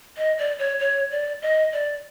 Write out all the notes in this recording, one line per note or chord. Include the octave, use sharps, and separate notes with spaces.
D#5
D5
C#5
C#5
D5
D#5
D5